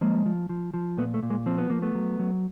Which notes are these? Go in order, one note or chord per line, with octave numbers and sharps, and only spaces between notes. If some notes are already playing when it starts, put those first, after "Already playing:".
F3 G#3 A#3
F3
F3
F3
A#2 A3 B3
A3
A#2
G#3 A#3
F3 C4
B3
F3 A#3
A3 B3
F#3
F#3